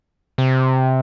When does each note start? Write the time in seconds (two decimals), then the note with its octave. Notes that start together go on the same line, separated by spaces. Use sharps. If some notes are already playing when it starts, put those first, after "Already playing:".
0.38 C3